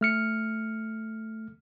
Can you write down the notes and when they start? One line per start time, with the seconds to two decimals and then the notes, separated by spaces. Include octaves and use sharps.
0.01 A3 F6 C#7